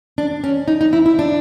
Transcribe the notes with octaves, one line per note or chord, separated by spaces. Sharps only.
D4
C#4
D#4
D#4
E4
E4
D4